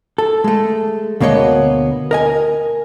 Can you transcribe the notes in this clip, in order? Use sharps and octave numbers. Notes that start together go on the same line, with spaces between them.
A4
G#3 A3
D2 B2 A#3 B3 C#5 D#5
A#4 D#5 G#5